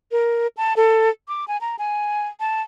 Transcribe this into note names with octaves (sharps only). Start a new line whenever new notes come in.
A#4
A5
A4
D6
G#5
A#5
G#5
A5